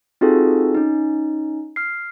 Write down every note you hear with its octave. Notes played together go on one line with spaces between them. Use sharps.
C4 D#4 F4 F#4 G#4 A4
C#4 D#4
F6 C7